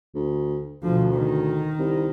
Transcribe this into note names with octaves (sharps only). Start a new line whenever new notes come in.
D2
D2 B2 F3
D#3
C2